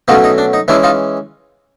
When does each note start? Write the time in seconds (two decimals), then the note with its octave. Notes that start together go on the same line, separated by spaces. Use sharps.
0.08 B2 F#3 A3 C#4 D#4 F4
0.24 D#4
0.38 D4
0.53 D#4
0.68 E3 G#3 C#4 D4 E4
0.83 D#4 F4